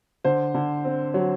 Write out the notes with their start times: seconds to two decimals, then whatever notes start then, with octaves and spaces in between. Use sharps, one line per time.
0.24 D3 C5
0.54 D3
0.85 C4
1.14 F#3